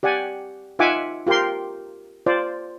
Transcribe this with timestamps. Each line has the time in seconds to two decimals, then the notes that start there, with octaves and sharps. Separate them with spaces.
0.03 G4 D5 F#5 G#5
0.79 D#4 F4 E5 F#5 G#5 D6
1.27 F4 G4 A#4 G5 C6
2.26 F4 C5 D5